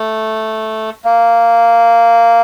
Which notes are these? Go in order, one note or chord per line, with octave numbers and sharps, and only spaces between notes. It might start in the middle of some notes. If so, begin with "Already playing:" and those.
Already playing: A3
A#3